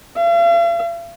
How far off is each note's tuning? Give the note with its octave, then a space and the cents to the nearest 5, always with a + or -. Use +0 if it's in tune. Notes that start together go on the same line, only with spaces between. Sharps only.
F5 -45